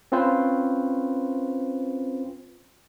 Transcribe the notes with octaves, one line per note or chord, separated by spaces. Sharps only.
C4 C#4 F4 B4 C5